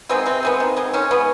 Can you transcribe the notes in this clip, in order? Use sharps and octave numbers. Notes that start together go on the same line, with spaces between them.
D#3 G#3 B3 C4
C3 C4
D#3 G#3 B3
D#3
G#3 B3
D#3 C#4
G#3 B3